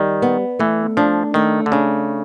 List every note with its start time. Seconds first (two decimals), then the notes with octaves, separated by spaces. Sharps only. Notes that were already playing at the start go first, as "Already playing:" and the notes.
Already playing: D#3 G3
0.22 B3
0.59 E3 A3
0.97 F3 D4
1.34 D#3 A3
1.66 D3
1.72 C#3 D4